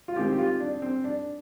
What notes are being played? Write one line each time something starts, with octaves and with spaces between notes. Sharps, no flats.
F4
D#3 G#3 C4 G4
G4
F4
D4
C4
D4